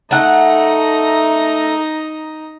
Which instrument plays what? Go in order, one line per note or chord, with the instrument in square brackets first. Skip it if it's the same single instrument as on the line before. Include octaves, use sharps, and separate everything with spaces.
[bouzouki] A3 F#5 [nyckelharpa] D#4 A#5